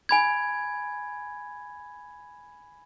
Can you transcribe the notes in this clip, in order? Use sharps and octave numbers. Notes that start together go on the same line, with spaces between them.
G#5 B5 G#6